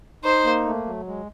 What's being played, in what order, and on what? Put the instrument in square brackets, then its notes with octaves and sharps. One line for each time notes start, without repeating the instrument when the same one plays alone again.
[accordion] D#4 [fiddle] C5
[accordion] A#3
A3
F#3
G#3